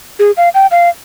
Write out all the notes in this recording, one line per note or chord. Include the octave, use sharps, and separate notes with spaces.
G#4
F5
G5
F5